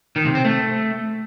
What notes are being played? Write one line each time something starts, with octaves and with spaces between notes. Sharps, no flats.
D#3
C3
C4
A3